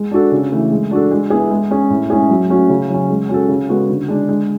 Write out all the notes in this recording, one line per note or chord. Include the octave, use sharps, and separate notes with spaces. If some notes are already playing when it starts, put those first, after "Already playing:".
Already playing: G#3
D4 F#4 A4
C#3
E3 A3
G#3
D4 F#4 A4
G#3
B3 E4 G#4
G#3
C#4 G#4
A2
G#3 C#4 E4 G#4
F#3
A3 C#4 F#4
C#3
F#3 C#4
G#3
C#4 F#4 A4
C#3
G#3 B3 F#4 A4
D3
G#3 D4
G#3